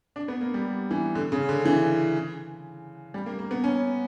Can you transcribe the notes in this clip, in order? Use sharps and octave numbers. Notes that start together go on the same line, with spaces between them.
D4
B3
A#3
G3
E3
D3
C#3
D3
E3
G3
A#3
A#3
B3
C#4